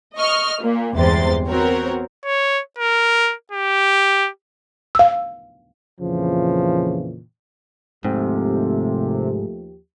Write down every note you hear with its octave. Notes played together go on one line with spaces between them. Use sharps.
D#5 C#6 F6
A#2 A#3
G1 E2 C3 G#3 C6 A6
B3 C4 F#4 A#4 C#5
C#5
A#4
G4
F5 E6
F2 A#2 C#3 E3 F3
D#2 G#2 C3 F3 A3 G4